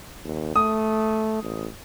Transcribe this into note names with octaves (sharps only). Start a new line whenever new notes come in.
D#2
A3 D#6
A1